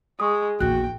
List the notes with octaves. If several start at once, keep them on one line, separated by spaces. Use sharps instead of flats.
G#3 C#6 D#6
A#1 E2 F#4 G5 F#6